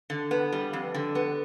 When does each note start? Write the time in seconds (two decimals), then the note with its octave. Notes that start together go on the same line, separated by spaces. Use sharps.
0.10 D3
0.31 B3
0.52 G3
0.73 F2
0.95 D3
1.15 B3